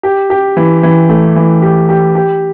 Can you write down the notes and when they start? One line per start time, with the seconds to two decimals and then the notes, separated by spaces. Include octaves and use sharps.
0.03 G4
0.30 G4
0.57 E3
0.83 E3
1.09 A3
1.36 E3
1.62 G4
1.89 G4
2.15 G4